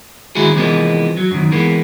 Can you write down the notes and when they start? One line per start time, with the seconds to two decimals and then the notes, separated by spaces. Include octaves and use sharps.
0.35 D#3 G#3 E4 F#4 G#4
0.55 C3 E3 F3 G#3 A#3 B3
1.17 F#3
1.31 F#2 D#3
1.52 E3 G#3 A#3 B3